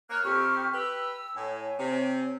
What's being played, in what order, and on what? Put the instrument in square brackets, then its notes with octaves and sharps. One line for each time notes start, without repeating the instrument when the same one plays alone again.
[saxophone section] A#3 C#5 [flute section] F6 F#6
[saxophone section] F2 [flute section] G4 C#6 F6
[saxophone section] G4 B4 [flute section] E6
[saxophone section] A2 [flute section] C#5 G#5
[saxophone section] C3